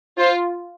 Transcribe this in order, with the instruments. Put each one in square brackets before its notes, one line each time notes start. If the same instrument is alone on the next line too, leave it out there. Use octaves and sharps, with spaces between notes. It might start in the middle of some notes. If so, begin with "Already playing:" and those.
[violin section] F4 [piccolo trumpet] C5